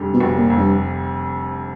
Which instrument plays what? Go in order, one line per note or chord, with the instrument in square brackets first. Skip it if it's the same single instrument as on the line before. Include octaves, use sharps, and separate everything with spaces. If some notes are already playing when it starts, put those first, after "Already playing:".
Already playing: [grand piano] F1 F2 D3 G3
[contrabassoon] B2
[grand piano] F1
[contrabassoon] A#2
[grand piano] F2
[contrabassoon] G2